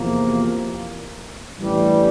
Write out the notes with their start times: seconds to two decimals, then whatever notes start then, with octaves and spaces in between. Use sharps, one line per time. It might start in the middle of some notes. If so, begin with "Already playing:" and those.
Already playing: E2 C3 F3 A#3
1.58 A1 G2 E3 G3